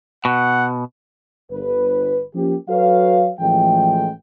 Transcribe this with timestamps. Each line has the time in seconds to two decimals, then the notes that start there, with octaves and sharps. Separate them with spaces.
0.25 B2 F#5
1.51 G1 B4
2.35 F3 A#3 C#4 G4
2.69 F#3 F#4 A4 B4 C#5 F5
3.39 A1 E3 F3 G#3 A3 G5